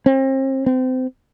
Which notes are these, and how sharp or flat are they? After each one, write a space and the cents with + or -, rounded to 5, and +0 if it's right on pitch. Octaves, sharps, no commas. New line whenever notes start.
C4 +35
C4 -30